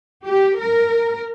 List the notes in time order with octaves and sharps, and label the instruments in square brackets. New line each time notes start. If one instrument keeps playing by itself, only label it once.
[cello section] G4
A#4